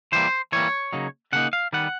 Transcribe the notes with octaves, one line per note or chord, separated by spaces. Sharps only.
E3 G3 A#3 C5
E3 G3 A#3 C#5
C#3 F#3 A#3 D#4
C#3 F#3 A#3 D#4 F#5
F5
D#3 G3 B3 F#5